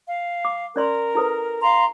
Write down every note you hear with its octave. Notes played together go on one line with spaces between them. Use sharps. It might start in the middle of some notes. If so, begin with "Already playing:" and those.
F5
D6
C#4 A#4 D5 C6
E4 A4 B4
F5 A#5 C6